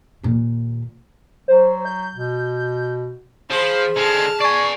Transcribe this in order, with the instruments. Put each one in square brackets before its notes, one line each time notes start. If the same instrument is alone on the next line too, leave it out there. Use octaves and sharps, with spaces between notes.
[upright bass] D#2 A#2
[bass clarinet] F#3 [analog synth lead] C5
[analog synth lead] G6
[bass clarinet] B2
[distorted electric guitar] F3 [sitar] G#4 [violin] C5 B5 [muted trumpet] C6
[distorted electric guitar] D3 G#3 [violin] A5 F6
[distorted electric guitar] D5 G#5 [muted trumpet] C#6 [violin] C7